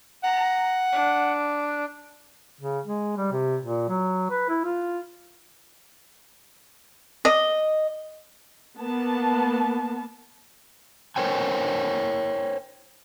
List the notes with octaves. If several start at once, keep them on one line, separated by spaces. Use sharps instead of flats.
F#5 A#5
D4
C#3
G#3
G3
C3
A#2
F#3
B4
E4
F4
D#5
A#3 B3 A5
A#4 C5 C#5 G5 G#5